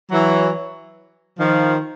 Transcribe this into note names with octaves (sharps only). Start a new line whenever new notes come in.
E3 F#3
D#3 F3